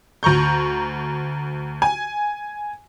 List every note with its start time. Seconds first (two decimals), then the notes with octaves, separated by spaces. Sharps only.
0.23 D2 A#5 C#6 G6
1.82 G#5